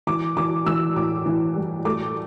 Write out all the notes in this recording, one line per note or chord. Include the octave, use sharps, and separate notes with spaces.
E3 D6
E3 D6
E3 E6
A2 D6
E3
G3
A3 D6